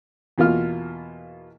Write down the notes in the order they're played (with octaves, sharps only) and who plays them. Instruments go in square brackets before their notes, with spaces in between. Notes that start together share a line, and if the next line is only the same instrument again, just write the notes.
[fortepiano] E2 B2 A#3 F4 F6